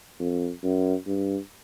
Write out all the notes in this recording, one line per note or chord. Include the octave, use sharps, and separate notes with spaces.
F2
F#2
G2